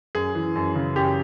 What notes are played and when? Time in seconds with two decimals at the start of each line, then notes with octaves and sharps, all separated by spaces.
0.15 F#2 G#4
0.35 E3
0.55 F#2
0.75 C#3
0.96 F#2 G4